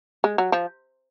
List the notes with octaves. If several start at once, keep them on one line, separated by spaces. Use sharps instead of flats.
G#3
F#3
F3